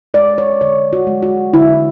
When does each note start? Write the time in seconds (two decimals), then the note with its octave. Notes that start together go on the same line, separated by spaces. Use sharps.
0.14 G#3 D5
0.38 C#5
0.61 D3 C#5
0.93 F#4
1.07 G#3
1.22 F#4
1.54 D3 E4